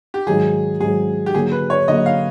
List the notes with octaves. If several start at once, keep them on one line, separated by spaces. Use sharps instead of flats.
G4
G#2 D#3 F#3 G#4
G#2 D#3 F#3 G#4
G4
D3 F#3 A#3 G#4
B4
C#5
D3 F#3 A#3 D#5
F5